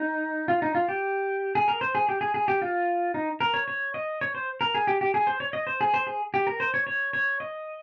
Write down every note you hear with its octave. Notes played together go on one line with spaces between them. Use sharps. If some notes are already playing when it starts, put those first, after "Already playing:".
Already playing: D#4
F4
D#4
F4
G4
G#4
A#4
C5
G#4
G4
G#4
G#4
G4
F4
D#4
A#4
C#5
C#5
D#5
C#5
C5
A#4
G#4
G4
G4
G#4
C5
C#5
D#5
C5
G#4
C5
G#4
G4
A#4
C5
C#5
C#5
C#5
D#5